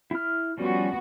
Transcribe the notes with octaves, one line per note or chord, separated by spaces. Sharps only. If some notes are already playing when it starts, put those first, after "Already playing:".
E4 F6
F3 G3 B3 C#4 F#4